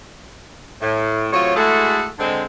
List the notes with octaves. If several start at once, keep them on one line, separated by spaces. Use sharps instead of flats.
A2
A2 C3 F#3 F4 C#5
G#3 A3 E4 F#4 G#4 A4
D3 G#3 C4